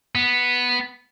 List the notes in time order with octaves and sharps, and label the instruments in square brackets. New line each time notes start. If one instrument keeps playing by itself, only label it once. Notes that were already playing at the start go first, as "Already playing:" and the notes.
[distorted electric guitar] B3